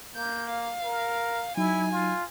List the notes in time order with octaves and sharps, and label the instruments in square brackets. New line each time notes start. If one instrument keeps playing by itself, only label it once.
[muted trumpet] A#3 [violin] G6
[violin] F5
[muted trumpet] A#4
[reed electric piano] F#3 D#4 [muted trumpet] E4 [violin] G#5
[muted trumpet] F4